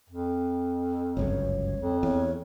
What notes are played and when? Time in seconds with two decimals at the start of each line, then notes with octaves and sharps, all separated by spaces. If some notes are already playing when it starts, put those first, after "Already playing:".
0.09 F2
1.17 G1 C#2 F#2 C#5
1.80 F2
2.03 E2 C#5